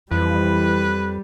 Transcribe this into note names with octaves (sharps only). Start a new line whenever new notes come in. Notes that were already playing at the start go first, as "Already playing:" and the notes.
F2 E3 G3 B4